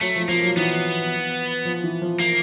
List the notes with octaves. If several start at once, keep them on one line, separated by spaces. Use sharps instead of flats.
F#3 A3
F3
F3 A#3
F#3
E3 B3
F3
E3
F3
A#3